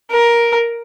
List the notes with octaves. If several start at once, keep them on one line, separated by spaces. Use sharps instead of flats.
A#4